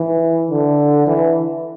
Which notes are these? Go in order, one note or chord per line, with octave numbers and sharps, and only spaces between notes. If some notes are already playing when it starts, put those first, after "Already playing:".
Already playing: E3
D3
E3